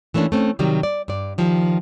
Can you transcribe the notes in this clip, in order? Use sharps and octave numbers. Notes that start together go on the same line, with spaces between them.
E3 A3 A#3 C#4 D4
A3 C4 C#4
C3 D#3 F#3 G3
D5
G2 D5
D#3 F3 G3